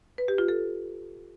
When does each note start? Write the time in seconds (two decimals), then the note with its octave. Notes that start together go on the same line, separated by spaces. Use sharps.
0.18 B4
0.28 G4
0.38 F4
0.48 A4